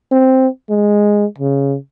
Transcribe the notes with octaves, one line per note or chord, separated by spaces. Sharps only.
C4
G#3
C#3